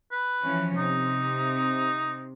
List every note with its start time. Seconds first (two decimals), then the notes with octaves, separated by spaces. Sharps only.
0.11 B4
0.43 E3 F3 C#4
0.77 C3 D#4